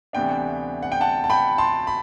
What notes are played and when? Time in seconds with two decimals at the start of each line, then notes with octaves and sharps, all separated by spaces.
0.13 D2 C3 E3 B3 D4 G5
0.83 F#5
0.92 G5
1.01 F#5 A5
1.24 A5
1.30 G5 B5
1.58 A5 C6
1.87 B5